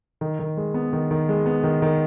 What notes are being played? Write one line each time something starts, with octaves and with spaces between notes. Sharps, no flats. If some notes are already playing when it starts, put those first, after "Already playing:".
D#3
D#3
G#3
B3
D#3
D#3
G#3
B3
D#3
D#3